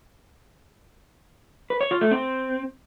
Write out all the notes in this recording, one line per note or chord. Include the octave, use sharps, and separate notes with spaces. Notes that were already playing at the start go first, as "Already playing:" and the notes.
B4
C#5
F4
A3
C4